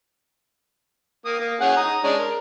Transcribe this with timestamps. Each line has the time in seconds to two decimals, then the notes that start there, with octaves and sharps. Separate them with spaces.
1.25 A#3 D#6
1.39 A#3
1.60 C#4 G#4 F#5
1.77 A#5 D#6
2.04 G#3 C#4 D4
2.18 A#4